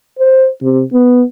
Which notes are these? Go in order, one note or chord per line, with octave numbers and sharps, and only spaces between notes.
C5
C3
B3